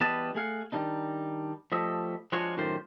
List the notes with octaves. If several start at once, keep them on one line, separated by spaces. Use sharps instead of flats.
E2 G3 B3 B4 D#5 A5
A3 G#4 F5 F#5
D#3 G3 G#3 D4 D#4
F3 G3 A3 D#5 E5
F3 G#3 D4 F4 F#4 C#5
F#2 A2 D#3 F4 G4 C5